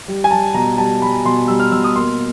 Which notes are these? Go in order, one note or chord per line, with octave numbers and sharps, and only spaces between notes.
G3
G#5
G3 A5
B2 A#5
G3 A5
G3 B5
B2 C6
G3 E6
F6
B2 E6
D#6
A#3 C6